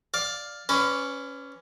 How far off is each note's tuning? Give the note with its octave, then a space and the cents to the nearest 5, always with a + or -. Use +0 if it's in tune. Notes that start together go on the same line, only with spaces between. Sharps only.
D5 +0 F5 +10
C#4 +0 B4 +25 D5 -15